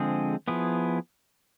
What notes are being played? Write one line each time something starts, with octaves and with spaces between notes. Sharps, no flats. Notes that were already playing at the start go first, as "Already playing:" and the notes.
Already playing: D3 F3 G#3 C4 G#4
F3 B3 E4 G#4